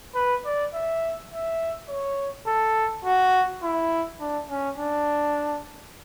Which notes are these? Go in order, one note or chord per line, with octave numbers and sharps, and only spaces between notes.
B4
D5
E5
E5
C#5
A4
F#4
E4
D4
C#4
D4